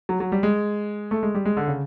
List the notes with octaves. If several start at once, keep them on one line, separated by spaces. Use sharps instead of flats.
F#3
F#3
G3
G#3
A3
G#3
G3
G#3
D3
C#3